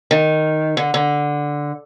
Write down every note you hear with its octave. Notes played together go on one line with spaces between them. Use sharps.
D#3
D3
D3